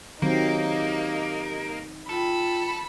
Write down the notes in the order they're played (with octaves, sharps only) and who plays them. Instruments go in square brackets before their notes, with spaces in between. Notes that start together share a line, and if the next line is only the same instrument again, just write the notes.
[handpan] D#3 F#3 C4 [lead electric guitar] A#3 [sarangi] D#4 [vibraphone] G4
[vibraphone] F4 G5 [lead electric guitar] A4 [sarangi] B5